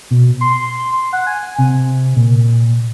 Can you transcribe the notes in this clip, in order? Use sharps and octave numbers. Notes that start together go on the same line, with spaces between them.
B2
C6
F#5
G#5
C3
A#2